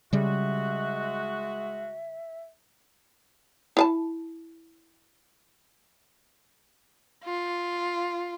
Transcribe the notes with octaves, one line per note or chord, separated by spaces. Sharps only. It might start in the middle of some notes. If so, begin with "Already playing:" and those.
C#3 G3 G#3 F#4 E5
E4 F5 A5
F4